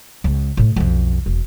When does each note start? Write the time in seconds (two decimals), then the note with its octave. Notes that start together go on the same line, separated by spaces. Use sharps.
0.24 C#2
0.57 A2 A3
0.76 B1 F2
1.26 E1